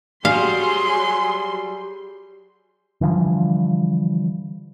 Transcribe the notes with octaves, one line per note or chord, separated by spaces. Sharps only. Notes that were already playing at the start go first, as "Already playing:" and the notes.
F#3 G3 G#4 F5 C6
D3 E3 F3 G3